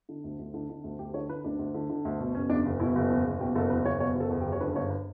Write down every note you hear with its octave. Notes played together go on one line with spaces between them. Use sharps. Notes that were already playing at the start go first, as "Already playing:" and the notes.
D3
D2
D2
D3
D3
D2
D2 G4
D3 C#5
D3 B4
D2 D4
D2
D3
D3
D2
B2
F#1 C#4
E2 D4
F#1
B2 E4
F#1
E2
F#1
B2 G4
F#1 A4
E2 B4
F#1 C#5
B2 C#5
F#1 A4
E2
G4
F#1
C#5
D3 B4
G1 C#5
B4